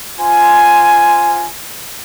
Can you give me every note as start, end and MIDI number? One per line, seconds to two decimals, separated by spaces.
0.19 1.48 65
0.19 1.48 72
0.19 1.48 80